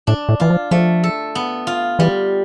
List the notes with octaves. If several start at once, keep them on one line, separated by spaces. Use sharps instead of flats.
A2 D4
A2
E3 F4
F3
F3 A3
A4
B3
F4
E3 G3